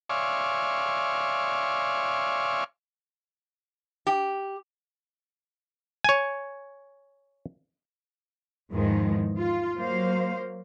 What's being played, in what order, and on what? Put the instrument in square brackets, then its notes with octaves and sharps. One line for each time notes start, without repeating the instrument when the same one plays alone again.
[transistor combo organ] C#5 D5 E5 F5 G#5 C6
[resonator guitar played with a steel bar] G4
[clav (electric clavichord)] C#5 G#5
[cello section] E2 G#2 D#3 F3 G#3
F4
F#3 A#3 C5 F5